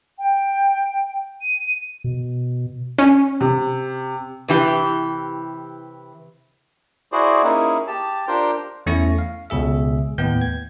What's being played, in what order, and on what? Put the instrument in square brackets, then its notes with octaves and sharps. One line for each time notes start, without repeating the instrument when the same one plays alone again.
[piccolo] G5
D#7
[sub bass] B2
[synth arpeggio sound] C#4
[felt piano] C3
[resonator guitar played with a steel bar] C3 E3 G4
[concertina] E4 F#4 G#4 C5 D5
A#3 C#4 D#4 E4 G#4
G4 A5
D4 F4 G4 A#4 C5 G5
[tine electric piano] E2 A3 C#4 E4 C#6 A#6
F5
C#2 B2 G#4 E5
D#2 A2 B3 G5 G6
G#6